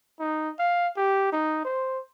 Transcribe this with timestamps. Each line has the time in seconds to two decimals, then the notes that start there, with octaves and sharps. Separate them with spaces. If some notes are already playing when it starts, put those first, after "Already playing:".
0.20 D#4
0.59 F5
0.97 G4
1.33 D#4
1.65 C5